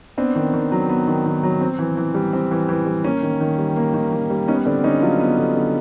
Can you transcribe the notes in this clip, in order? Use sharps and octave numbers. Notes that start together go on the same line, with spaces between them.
B3 C4 D4
D#3
D#3
F#3
B3
D#3
D#3
F#3
C4
E3
E3
G3
C4
E3
E3
G3
A#3 C#4
D#3
D#3
G3
A#3
D#3
D#3
G3
B3 C#4 D#4
D3 C4 D4
D3 C#4 D#4
F#3 D#4 F4
B3
D3
D3